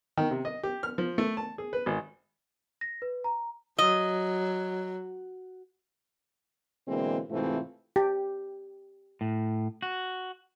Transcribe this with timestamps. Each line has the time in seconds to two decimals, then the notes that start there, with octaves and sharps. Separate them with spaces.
0.17 D#3
0.31 C3
0.45 D#5
0.63 G4
0.83 F6
0.98 F3
1.18 A3
1.37 A5
1.58 G#4
1.73 B4
1.86 G#1
2.81 A#6
3.02 B4
3.24 A#5
3.79 F#3 D#5
6.87 B2 D3 E3 G#3 A#3 C4
7.30 G#2 C3 E3 A3 C4 F4
7.96 G4
9.21 A2
9.82 F#4